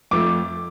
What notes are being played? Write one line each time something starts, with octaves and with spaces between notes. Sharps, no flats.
F2 F3 A3 D6